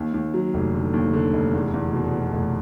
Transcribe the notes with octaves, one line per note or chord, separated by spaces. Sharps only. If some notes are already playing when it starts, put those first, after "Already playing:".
Already playing: D#2
D#2
F#3
F1
D3
D#2
D3
F1
E2
E2
B2
B2
F1